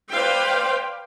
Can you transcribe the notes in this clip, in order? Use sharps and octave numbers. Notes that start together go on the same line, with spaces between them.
B4 C5 D5 F5 G5